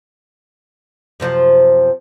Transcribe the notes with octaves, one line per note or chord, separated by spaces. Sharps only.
F#2 C3 F3